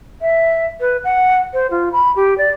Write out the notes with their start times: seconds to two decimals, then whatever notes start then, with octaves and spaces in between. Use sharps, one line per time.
0.21 E5
0.80 B4
1.04 F#5
1.53 C5
1.71 F4
1.92 B5
2.16 G4
2.38 D5